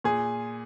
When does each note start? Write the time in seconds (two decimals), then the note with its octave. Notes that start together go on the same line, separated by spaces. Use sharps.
0.04 A#2 G#4